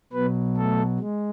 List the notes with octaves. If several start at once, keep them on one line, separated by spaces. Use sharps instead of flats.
B2 F#3 B3 B4
A3 A4
G#3